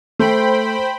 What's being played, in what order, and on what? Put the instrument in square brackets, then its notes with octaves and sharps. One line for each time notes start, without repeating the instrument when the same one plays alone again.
[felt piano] A3 [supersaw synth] C5 G5 B5